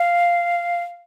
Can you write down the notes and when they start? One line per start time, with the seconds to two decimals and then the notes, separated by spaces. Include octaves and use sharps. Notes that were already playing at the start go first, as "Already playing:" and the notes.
Already playing: F5